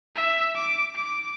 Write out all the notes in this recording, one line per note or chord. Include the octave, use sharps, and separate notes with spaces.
E5
D6
D6